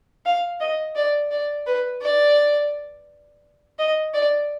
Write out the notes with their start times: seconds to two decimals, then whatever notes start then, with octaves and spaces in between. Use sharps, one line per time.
0.26 F5
0.60 D#5
0.96 D5
1.31 D5
1.66 B4
2.02 D5
3.79 D#5
4.14 D5